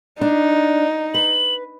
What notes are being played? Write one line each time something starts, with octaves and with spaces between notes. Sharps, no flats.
D4 D#4
B4 F#7